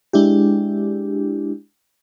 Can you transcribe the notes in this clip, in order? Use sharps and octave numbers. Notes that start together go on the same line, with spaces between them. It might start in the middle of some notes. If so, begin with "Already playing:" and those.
G#3 D4 E4 G4